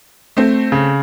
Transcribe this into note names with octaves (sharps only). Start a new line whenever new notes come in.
A3 C4
C#3